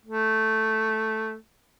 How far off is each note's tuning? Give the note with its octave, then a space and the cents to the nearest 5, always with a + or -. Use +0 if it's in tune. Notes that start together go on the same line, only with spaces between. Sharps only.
A3 +0